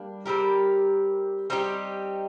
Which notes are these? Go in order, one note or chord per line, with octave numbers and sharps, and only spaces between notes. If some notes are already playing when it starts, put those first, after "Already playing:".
Already playing: G3 A#3 D4
G3 C4 G4 A#4
G3 C4 D#4 G4